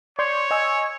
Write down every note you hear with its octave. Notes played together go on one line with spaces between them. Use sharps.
C#5 D5 C6 G6
D#5 G#5 E6